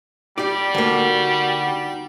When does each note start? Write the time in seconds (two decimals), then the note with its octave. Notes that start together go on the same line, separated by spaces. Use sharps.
0.38 G3 D#4 G4 D5
0.74 D3 A#3 F#4